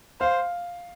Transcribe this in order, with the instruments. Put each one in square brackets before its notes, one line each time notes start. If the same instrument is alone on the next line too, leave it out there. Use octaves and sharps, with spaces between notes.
[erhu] C5 [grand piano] F5